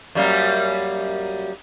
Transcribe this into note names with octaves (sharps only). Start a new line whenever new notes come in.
F#2 G3 A#3